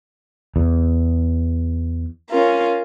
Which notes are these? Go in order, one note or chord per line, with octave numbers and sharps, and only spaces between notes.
E2
C#4 F4 A#4